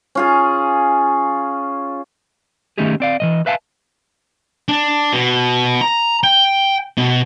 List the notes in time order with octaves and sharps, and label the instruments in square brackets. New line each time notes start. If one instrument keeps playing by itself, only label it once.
[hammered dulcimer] C#4 F4 G#4
[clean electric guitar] D#3 A3 C#4 D#4 G4 G#4
C4 D5 F5
E3 F3 D#5
B4 E5 F5 G#5 A5
[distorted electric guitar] D4
B2
A#5
G5
B2